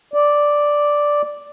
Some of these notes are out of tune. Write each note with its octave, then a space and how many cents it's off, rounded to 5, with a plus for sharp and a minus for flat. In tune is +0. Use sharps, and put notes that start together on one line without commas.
D5 +0